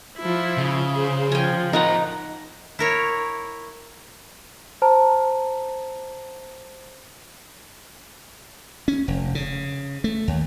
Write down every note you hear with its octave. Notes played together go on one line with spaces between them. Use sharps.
F3 E4
C#3
G#4 C5
F3 G5 G#5
D#4 A#4 C5 F#5 A#5
E4 A#4 C#5
C5 A5 A#5
C#4
F1
C#3
A3
D#2